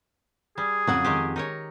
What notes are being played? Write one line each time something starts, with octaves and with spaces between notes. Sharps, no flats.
G3 G#4
F2 C#3 F#3 F#5
D#3 G#3 G4
D#4 A#4 C#5